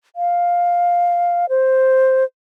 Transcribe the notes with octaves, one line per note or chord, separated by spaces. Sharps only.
F5
C5